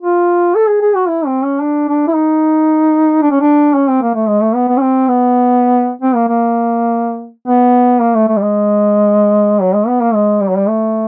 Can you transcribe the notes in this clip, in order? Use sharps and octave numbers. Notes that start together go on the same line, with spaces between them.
F4
A4
G#4
G#4
F#4
E4
C4
C#4
D4
D4
E4
D#4
D4
C#4
D4
C#4
C4
A#3
A3
G#3
A3
B3
B3
C#4
C4
B3
C4
A#3
A#3
B3
A#3
A3
A3
G3
G#3
F#3
G#3
B3
A#3
G#3
G3
F#3
G3
A3